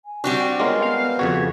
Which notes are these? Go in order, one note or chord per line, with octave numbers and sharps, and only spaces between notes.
G#5
G3 C4 D4 F#4
F#5
G#3 B3 C#4 F4 A#4
B3 F5
F2 C#3 F#4 C#5